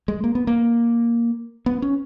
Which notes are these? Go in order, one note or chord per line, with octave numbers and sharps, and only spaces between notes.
G#3
A#3
B3
A#3
B3
C#4